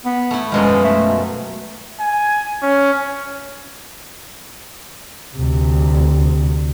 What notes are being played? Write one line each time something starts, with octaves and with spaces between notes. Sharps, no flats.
B3
A3 E4
F#2 B2 F3 G#3
A3
G#5
C#4
D2 C3